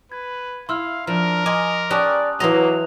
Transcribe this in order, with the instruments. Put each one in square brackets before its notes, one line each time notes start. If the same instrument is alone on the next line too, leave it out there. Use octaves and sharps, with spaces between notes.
[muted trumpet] B4 [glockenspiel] G#6
[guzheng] E4 [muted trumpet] F5 [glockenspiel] C6 E6 F6
[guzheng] F3 [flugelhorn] D4 [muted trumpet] A#4
[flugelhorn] D#5 [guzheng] G#5 [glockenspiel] C6 D6
[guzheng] C#4 G4 [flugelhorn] D5 [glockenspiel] A5 D#6 F#6
[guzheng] E3 C5 D#5 [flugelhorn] F#3 [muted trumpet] A#3 [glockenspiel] F7